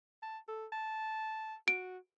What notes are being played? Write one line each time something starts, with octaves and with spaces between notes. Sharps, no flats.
A5
A4
A5
F#4 D7